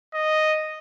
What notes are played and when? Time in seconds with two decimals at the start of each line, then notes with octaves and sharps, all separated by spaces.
0.14 D#5